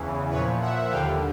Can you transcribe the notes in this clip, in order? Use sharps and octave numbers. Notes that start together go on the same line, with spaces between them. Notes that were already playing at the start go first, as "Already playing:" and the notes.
Already playing: E2 C#3 E3
A#2 F3 B4 C#5
E5 F#5
D#2 D3 G3 F5 G5